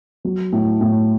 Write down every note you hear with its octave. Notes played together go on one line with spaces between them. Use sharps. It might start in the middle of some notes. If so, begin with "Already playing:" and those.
F#3
A2
A2